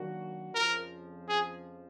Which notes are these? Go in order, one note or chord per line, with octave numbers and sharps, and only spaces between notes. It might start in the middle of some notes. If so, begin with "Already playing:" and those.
Already playing: D#3 F#3 A#3 D4 F#4
F2 C#3 F3 A#4
G#4